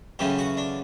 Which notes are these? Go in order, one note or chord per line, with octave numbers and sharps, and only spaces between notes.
F#2 C#3 E3 A3 G4
F#4
D4